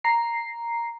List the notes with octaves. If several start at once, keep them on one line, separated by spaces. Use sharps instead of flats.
A#5 C7